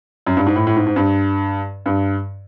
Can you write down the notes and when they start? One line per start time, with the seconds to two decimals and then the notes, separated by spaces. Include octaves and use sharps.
0.27 F#2
0.37 G2
0.46 G#2
0.56 A2
0.67 A2
0.76 G#2
0.87 G#2
0.96 G2
1.86 G2